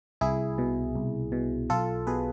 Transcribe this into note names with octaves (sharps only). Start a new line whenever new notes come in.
C2 E4 G#4
B2
C2
B2
B1 F4 A4
B2 G#4 B4